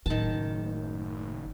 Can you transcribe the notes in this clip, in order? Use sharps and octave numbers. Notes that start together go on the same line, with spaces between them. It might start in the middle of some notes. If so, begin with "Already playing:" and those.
F#1 A2 D#3 A5